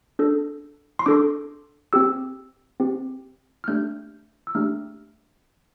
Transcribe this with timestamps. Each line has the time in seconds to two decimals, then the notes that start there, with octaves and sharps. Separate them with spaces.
0.19 D4 A4
0.99 C6
1.06 D4 A4 D6
1.93 C4 G4 E6
2.80 C4 G4
3.64 F6
3.68 A3 D4 G4 G6
4.47 E6
4.55 A3 D4 G4 F6